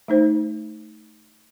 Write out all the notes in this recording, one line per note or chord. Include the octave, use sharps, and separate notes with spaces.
A3 D#4 C5